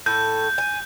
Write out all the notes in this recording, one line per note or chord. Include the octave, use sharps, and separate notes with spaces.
A2 A4 G6
G#5